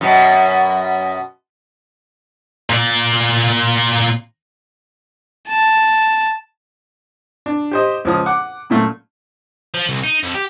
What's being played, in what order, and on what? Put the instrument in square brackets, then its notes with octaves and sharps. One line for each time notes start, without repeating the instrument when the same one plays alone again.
[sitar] F#2 B2
[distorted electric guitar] A#2 D5
[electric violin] A5
[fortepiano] D4
G4 C5 D#5
C#2 F3 D#6
F#5 D6
F#2 A#2 A3
[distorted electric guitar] F3
C2
D#4
F2
G4